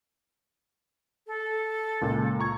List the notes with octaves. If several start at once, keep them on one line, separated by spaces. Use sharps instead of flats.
A4
C#2 A#2
A#5 C#6 G#6